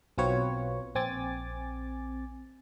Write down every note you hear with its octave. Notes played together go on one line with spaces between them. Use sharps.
B1 F#3 C4 F4 B4 C#5
A#1 C4 G#5 D6 A6